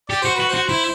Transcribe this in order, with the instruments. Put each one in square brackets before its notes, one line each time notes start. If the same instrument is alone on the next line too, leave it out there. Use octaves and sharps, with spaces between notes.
[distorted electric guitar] G4 [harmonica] D5
[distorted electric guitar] F#4 [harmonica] C5
[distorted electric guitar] F#4 [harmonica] B4
[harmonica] C5
[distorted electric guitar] F#4
[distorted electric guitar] E4 [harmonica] C5